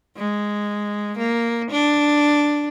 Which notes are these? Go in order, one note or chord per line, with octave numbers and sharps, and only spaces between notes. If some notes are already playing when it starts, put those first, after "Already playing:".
G#3
A#3
D4